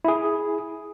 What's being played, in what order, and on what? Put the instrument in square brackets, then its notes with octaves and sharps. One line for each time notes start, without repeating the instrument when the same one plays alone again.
[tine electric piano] E4 G#4